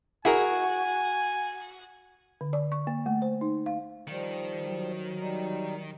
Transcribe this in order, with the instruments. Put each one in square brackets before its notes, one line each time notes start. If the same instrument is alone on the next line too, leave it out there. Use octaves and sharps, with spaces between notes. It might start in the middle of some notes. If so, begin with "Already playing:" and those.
[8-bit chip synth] E4 G#4 A#4 [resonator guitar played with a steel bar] F#4 [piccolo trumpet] G#5
[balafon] D3
D5
C#6
A#3
A3
C5
D#4
F5
[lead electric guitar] D#3 [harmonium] F3 G3
[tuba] F#3
[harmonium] G3 D#4